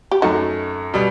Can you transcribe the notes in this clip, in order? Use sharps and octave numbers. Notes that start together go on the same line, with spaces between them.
G4
F#2 F#3 A3 D#4 F#4
B2 G3